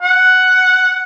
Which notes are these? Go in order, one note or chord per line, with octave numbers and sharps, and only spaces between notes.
F#5